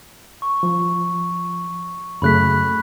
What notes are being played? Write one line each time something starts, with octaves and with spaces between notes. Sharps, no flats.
C#6
F3
F#2 C#3 A3 B5 F#6 B6